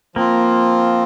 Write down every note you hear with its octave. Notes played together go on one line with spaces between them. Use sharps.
F3 A#3 C4 F4